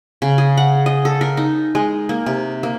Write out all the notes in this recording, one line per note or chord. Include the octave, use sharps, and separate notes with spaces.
C#3
G#4
F#5
D#5
A4
A#4
D#4
G#3
A#3
C3
A#3